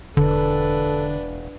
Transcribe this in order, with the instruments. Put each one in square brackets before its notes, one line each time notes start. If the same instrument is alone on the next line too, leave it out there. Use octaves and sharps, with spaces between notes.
[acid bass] E1 [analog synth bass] D3 [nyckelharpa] D4 B4 [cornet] A4